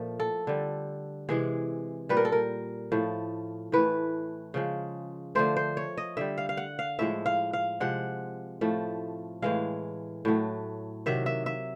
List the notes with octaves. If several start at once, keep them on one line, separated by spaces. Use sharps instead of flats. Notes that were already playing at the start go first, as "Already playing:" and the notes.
Already playing: A#2 F3 A3
A4
D3 G3
C3 E3 G#3 G#4
A#2 G3 B4
A#4
A4
A#4
A2 F3 A3
A2 E3 A3 B4
C#3 F3 G#3
D3 F3 A3 C5
C5
C#5
D#5
D3 G3 E5
F5
F5
F#5
F5
A2 F3 G#3 E5
F5
F5
C3 F3 G#3 F#5
A2 F3 A3
A2 E3 G#3 F5
A2 F#3 A3
C3 D#3 F#3 E5
E5
E5